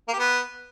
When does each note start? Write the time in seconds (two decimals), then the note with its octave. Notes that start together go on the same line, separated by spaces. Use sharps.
0.08 A#3
0.13 G4
0.19 B3